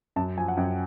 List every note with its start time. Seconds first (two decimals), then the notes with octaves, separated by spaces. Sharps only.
0.16 F#2 A5
0.37 F3 G#5
0.48 F#5
0.57 F#2 G5